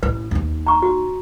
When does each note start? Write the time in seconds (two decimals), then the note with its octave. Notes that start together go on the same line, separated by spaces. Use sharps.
0.03 A1 E4 B4
0.31 D#2 D#4
0.67 A#5 C#6
0.82 F#4